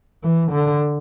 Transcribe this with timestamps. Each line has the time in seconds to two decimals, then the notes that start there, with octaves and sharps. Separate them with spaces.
0.23 E3
0.51 D3